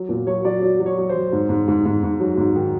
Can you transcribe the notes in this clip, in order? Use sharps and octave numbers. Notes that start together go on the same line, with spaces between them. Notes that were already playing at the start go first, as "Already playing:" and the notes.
Already playing: F#3
A#2
F#3 C#5
F#3 D5
F#3
F#3
C#5
F#3
F#3 C5
G#2
G#2
G#2
G#2
G#2
F#3
G#2
D#3